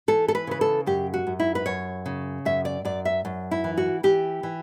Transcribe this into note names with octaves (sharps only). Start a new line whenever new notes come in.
E3 A4
A4
B4
C#3 B4
A4
F#2 G4
F#4
F#2
E4
B4
F#2 C#5
C#3
F#2 E5
D5
F#2 D5
E5
F#2
E4
E3
F#4
E3 G4
E3